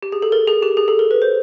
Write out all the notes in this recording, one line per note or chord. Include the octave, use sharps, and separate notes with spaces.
G4
G#4
A4
A#4
G#4
G4
G#4
A4
A#4
B4
C5